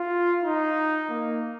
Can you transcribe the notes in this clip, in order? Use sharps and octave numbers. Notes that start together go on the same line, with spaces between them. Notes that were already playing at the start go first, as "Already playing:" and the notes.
Already playing: F4
D#4
A#3